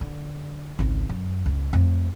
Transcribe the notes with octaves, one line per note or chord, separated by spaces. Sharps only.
D3
G#1 C#2
F#2
C#2
F2 A3